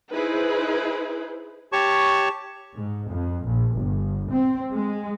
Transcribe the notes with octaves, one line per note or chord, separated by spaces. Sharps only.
D#4 E4 G#4 B4 C5
G4 C#5 A5 C#6
G#2
F2
A#1
G1
C4
G#3